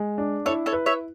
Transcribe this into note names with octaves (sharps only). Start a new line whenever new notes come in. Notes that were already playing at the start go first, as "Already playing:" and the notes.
Already playing: G#3
D4
E4 A4 C#5
A4 C#5
B4
C#5 E5